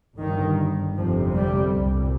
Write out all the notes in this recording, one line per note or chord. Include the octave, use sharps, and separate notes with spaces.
G1 G2 D#3
G1 F2 C3 F3
G3
C2 A#2